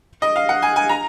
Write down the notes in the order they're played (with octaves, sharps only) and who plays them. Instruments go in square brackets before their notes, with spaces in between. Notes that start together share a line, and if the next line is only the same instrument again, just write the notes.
[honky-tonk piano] D#5
F5
F#5
G#5
G#5
A#5